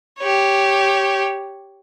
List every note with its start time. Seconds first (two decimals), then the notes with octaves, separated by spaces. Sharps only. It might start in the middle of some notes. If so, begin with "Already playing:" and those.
0.19 G4 C#5